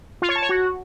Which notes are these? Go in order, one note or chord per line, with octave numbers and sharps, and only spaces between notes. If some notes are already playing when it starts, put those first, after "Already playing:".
F4
C#5
A5
C#5
F#4